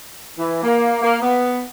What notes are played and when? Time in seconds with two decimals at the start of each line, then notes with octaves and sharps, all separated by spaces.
0.38 E3
0.63 A#3
1.02 A#3
1.21 B3